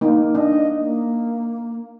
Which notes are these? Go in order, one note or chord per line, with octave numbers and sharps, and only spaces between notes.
A#3 D#4
D4 D#5
A#3